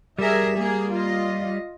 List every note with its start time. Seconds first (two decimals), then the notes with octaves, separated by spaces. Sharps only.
0.19 G3 G#4 A#4 E5
0.58 A#3 G#4
0.94 F4 D#5